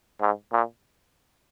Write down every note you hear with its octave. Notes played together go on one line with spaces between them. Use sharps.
G#2
A#2